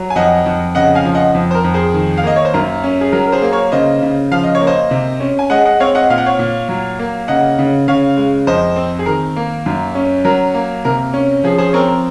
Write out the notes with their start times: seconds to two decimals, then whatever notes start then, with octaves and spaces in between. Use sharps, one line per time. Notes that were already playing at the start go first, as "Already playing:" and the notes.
Already playing: F#3
0.10 G#5
0.15 F2 D#5 F#5
0.46 F2
0.75 C#3 D#5 F#5
0.95 F5 G#5
1.05 F3
1.14 D#5 F#5
1.35 F2
1.51 C5
1.55 A#4
1.64 F2
1.74 G#4 C5
1.94 D#3
2.17 F5
2.24 A#3 D#5
2.36 C#5
2.45 C5
2.54 F#2 A#4
2.84 C#4
3.01 G#4
3.12 F#3 A#4
3.27 A#4
3.32 G#4 C5
3.42 A#3
3.53 A#4 C#5
3.72 C#3 C5 D#5
4.02 C#3
4.31 F3 F5
4.44 D#5
4.55 C#5
4.61 A#3
4.67 C5 D#5
4.91 C3
5.20 C#4
5.39 G#5
5.50 G#3 D#5 F#5
5.65 D#5 F#5
5.80 C4 C#5 F5
5.95 D#5 F#5
6.10 A#2 F5
6.18 F#5
6.26 C#5 F5
6.39 A#2
6.69 F#3
6.99 A#3
7.28 C#3 D#5 F#5
7.59 C#3
7.88 C#3 C#5 F5
8.17 G#3
8.47 F2 C5 D#5
8.76 C4
8.99 G#4
9.06 D#3 A#4
9.36 A#3
9.66 F#2
9.95 C#4
10.25 F#3 A#4
10.54 A#3
10.85 C3 A#4
11.14 C#4
11.44 F3 G#4
11.58 G#4 C5
11.73 C4 A#4 C#5
11.88 A#4